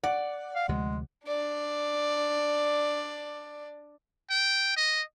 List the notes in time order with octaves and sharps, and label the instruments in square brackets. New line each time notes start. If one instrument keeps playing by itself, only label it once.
[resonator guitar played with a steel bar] D5 [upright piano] F#5
[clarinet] F5
[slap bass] D2 C3 F3 [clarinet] G#3
[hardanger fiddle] D4 D5
[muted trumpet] G5
D#5